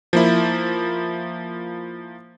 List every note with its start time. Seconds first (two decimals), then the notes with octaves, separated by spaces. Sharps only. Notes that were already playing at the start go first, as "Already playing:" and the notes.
0.13 F3 A#3 E4